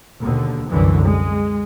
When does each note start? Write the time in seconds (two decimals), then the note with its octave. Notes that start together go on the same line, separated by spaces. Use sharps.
0.20 D#2 B2 D3
0.69 C2 F#2 D3 E3
1.05 G#3